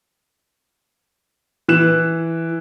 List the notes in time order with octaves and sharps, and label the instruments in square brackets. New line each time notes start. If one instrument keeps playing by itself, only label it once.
[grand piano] E3 F#6 E7